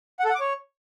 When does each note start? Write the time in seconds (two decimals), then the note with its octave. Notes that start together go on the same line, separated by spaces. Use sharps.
0.19 F#5
0.25 A4
0.30 F#5
0.35 D6
0.40 C#5